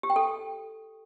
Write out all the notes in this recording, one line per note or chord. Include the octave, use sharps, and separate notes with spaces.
G4
G5
A4